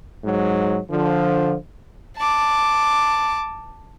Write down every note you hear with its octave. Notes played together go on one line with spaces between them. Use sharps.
G#2 F#3
D3 F3
A5 D6